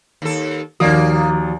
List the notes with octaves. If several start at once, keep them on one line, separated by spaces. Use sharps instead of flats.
D#2 A4
D#2 D#3 F3 A#3 F#4 D5 D#6